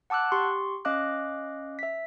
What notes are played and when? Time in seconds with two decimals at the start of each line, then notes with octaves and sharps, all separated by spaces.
0.10 F#5 A5 D6 E6 F#6
0.32 G4 C6 C#6
0.85 C#4 D#5 F5 D6 F#6
1.79 E5 B6